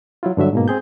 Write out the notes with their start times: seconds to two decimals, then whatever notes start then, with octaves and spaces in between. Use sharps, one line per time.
0.23 F#3 E4 F4
0.37 G2 D3 F#3 E5
0.53 G#2 B2 A#3
0.68 C4 G#4 G6